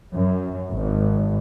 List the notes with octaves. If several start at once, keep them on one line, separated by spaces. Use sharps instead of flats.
F#2
G#1